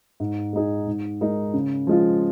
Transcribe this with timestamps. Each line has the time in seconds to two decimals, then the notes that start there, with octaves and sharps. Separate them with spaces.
0.20 G#2
0.53 G#3 D#4 G#4
0.87 G#2
1.21 G#3 D#4 A#4
1.54 C#3
1.87 F3 G#3 F4